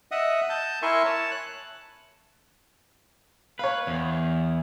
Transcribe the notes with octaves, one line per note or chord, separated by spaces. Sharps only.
D#5 E5 F#5 D#6
A5 G6
E4 A#4 E5 G#5 C6 C#6
C#5 A5
F#6
B4 C#5 F5
E2